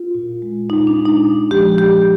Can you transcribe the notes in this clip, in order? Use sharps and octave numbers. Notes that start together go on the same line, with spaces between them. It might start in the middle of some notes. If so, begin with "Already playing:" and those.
Already playing: F4
A#2
G#3
A#2 D#4
D4
G#3
D#4
A#2
F3 G#3 G4
A#2 G4